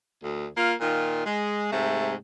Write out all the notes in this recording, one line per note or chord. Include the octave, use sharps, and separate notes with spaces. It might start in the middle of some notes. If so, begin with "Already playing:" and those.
D2
A#3 F4
A#2 D#3 F4
G#3
G#2 C3 A3